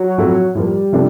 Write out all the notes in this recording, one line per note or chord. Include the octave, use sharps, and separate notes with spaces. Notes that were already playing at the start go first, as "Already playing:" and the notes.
Already playing: F#3
A2 F3 A3 C4 E4
A2 F3 G3 A#3
C3 F3 A3 D4